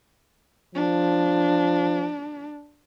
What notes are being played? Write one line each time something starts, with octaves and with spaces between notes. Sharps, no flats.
F3 D4